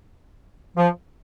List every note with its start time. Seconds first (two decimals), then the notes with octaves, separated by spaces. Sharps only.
0.76 F3